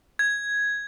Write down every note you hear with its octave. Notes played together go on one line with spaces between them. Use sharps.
G#6